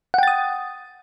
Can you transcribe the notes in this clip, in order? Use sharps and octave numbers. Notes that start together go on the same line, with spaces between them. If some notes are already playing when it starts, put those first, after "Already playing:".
F#5 G5 D#6 A6